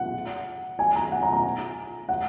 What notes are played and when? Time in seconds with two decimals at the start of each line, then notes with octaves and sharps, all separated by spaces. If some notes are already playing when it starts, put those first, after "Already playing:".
Already playing: F#5
0.79 G#5
0.96 A#5
1.12 F#5
1.23 A#5
1.33 A#5
2.09 F#5